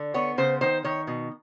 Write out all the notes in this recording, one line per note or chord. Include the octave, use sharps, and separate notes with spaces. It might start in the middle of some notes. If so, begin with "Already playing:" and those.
Already playing: D3
B3 C#5
C#3 C5
D#3 C5
D#3 C#5
B2